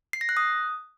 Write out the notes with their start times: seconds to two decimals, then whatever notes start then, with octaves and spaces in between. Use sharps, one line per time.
0.13 C7
0.21 A#6
0.29 F#6
0.37 D#6